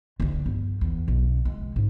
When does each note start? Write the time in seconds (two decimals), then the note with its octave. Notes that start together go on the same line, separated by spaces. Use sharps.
0.20 D2 D3
0.46 G1
0.81 E2
1.08 B1
1.45 G#3
1.76 G#2